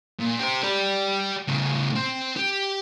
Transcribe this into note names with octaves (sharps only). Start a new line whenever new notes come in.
A#2
G4 C5
G4 D5
A2 C#3
C4
G4